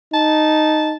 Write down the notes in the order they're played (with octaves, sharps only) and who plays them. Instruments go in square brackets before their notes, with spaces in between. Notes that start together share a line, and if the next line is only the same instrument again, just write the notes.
[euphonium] D#4 [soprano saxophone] A5